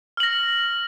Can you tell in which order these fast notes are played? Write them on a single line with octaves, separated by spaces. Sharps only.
F6 F#7 A#6